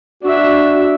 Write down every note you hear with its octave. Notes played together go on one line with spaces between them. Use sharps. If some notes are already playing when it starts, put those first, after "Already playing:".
D4 F#4 E5